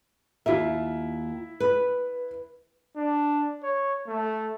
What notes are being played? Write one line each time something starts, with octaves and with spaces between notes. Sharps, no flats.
D#2 E4 F4 A#4 E5
B4
D4
C#5
A3